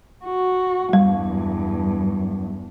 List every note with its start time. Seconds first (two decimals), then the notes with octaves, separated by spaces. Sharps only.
0.25 F#4
0.93 E2 G2 G3